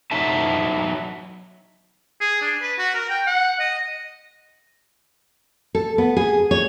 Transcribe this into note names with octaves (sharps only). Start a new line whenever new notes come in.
F#3 D#4 E5 A5
G#4
D4
B4
F#4
A#4
G5
F#5
D#5
A4
B3
G#4
C#5